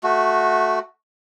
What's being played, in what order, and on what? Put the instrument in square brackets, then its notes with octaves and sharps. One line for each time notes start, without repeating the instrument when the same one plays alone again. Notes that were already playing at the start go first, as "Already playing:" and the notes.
[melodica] A3 F#4